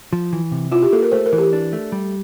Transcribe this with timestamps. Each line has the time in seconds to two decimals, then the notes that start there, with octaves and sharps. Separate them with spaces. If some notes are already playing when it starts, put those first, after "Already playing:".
0.13 F3
0.33 E3
0.52 C3
0.72 E4 F4
0.83 G4
0.93 A#3 A4
1.02 A#4
1.12 A3 C5
1.26 A#4
1.33 E3
1.38 G4
1.53 D4
1.73 A3
1.92 G3